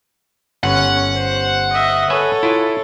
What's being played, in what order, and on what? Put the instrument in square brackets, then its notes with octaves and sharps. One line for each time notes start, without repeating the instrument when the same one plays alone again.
[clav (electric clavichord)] G1 [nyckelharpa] C#4 [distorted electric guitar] F#5
[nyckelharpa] C5
D#5 E5
[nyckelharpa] A4 C#5 [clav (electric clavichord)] B4 E5 G#5
[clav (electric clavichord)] E4 F4